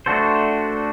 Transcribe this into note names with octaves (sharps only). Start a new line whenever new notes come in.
A3 D4 F#4 A4 C5